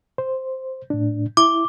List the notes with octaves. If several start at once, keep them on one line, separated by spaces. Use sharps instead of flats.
C5
A2 D4
E4 D6